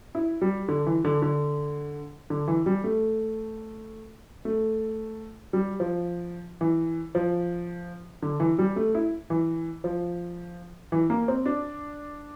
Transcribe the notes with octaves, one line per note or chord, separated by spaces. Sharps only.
E4
G3
D3
E3
D3
D3
D3
E3
G3
A3
A3
G3
F3
E3
F3
D3
E3
G3
A3
E4
E3
F3
E3
A#3
C4
D4